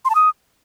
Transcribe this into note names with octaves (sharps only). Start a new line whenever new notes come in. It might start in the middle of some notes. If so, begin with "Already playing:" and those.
C6
A5
D#6